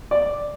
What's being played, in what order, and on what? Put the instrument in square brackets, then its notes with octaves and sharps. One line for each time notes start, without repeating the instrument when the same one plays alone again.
[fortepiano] D5